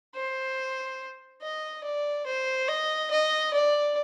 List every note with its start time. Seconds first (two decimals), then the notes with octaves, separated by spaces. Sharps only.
0.15 C5
1.42 D#5
1.84 D5
2.26 C5
2.69 D#5
3.11 D#5
3.53 D5